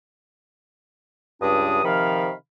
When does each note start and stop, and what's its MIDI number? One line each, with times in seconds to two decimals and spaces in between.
1.41 1.83 37
1.41 1.83 43
1.41 1.83 62
1.41 1.83 87
1.84 2.31 48
1.84 2.31 51
1.84 2.31 53
1.84 2.31 77
1.84 2.31 83
1.84 2.31 89